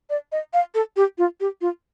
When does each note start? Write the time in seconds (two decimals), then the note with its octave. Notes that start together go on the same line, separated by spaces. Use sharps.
0.10 D5
0.32 D#5
0.53 F5
0.75 A4
0.96 G4
1.18 F4
1.40 G4
1.61 F4